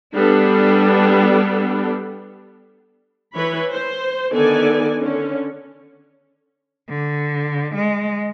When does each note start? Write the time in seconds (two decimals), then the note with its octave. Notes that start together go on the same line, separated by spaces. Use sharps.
0.15 G3 B3 D4 A4
3.35 E3 B4 C#5 B5
3.70 C5
4.32 D3 D#3 B3 A4 D5 G#5
5.00 D3 C#4
6.89 D3
7.75 G#3